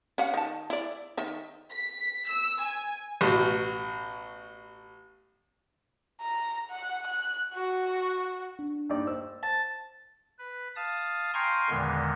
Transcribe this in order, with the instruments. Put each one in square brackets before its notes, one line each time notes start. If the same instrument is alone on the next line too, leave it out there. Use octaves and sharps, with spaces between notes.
[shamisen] C#4 F5 F#5
D#3 A5
E4 D5
D#3 E5
[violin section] B6
E6
G#5
[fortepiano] A1 B2
[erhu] A#5
F#5
F#6
F#4
[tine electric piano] D4
[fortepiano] G2 D#4 D5
[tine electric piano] C5 [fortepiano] E6
[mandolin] A5
[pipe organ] B4
F5 A5 D#6
F5 G5 G#5 A#5 C6 C#6
E2 A#2 D3 D#3 G#3 B3